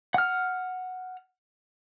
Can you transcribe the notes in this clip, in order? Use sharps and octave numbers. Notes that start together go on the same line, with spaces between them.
F#5 F6